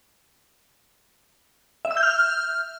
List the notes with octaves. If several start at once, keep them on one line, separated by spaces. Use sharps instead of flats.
E5
E6
G6
F6